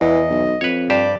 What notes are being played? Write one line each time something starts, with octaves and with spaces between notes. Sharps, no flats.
E2 E3 D#5
B1
F2 B4 C#5
G2 G4 C5 D5